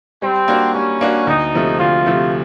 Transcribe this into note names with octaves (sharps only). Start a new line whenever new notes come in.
G3 C4
A#3 D4 F#4
G3 C#4
A#3 D4 F#4
D2 D#4
C3 F3 A3
D2 F4
C3 F3 A3